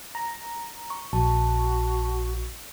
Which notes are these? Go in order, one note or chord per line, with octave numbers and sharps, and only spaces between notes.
A#5
C#6
A#1 F#4 A5